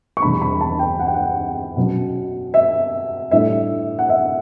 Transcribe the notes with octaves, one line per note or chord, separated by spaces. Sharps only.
C#6
E2 B2 G3 D4 B5
B5
A5
G5
F#5
G5
F#5
B2 F#3 C#4
E5
A2 G3 D4 E5
F#5
E5